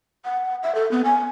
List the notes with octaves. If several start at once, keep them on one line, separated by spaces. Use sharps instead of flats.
F#5
E5
A4
B3
G#5